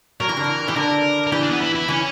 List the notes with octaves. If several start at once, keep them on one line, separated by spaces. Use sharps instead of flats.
F#3 A#4
E3
D3
E3
E3 G4
D3 A#4
A#4
E3 G4
D4
B3
E4
E4
E3 C#4